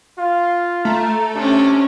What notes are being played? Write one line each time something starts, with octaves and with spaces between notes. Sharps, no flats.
F4 F5
A3 A#5
C3 C#4 D4 G4